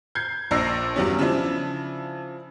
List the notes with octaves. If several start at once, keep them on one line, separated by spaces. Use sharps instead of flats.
G6 G#6 C7
A#1 D4 D5 E6 A#6 C7
E2 G2 F#3 G3 B3 C#4
C#3 F3 D4 E4